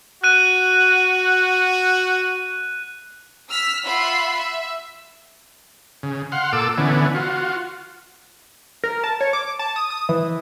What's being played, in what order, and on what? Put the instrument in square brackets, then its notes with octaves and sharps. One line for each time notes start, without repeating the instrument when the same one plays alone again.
[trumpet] F#4 [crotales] F#6 D#7
[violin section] E6 F6 B6
F4 E5 F#5 B5 C7
E5
[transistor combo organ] C#3
F5 F#5 C6
A#2 A4 D6 E6
D3 E3 B3 C#4
F4 F#4
[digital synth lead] A#4
A5
C#5
D6
A5
D#6
D#6
E3